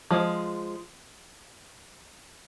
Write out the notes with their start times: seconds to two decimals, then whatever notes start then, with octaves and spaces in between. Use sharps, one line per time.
0.11 F3 G#3